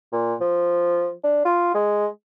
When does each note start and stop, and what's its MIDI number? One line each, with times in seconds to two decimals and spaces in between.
0.13 0.35 46
0.41 1.12 53
1.24 1.42 62
1.45 1.70 65
1.74 2.07 56